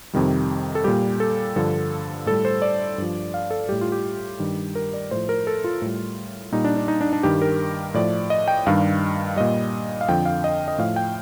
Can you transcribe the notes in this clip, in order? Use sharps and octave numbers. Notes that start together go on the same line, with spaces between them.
F2 C3 D#3 G3
A4
A#2 G3 G4
A4
G2 D3 F3 A4
A2 G3 A4
C5
D5
G2 F3
F5
A4
A2 G3 G4
F4
G4
G2 D#3 G3
A#4
D5
A2 F3 C5
A#4
A4
F4
A2 G3
A#2 G3 D#4
D4
D4
D#4
D4
D4
G2 D#3 G3 G4
A#4
A2 F3 D5
D#5
G5
G2 D#3 G3 F5
A#2 G3 D#5
F5
F2 D3 F3 G5
F5
D#5
D#5
A2 F3 F5
G5